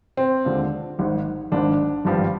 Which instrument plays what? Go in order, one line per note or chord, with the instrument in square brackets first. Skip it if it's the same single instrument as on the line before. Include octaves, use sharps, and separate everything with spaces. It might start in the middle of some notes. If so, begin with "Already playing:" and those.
[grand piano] C4
[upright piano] D#2 D3 G#3 D4 F4
G#1 G#2 D#3
[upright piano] G#1 G#2 D#3 [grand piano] D4
[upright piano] G#1 G2 F3 C4 G4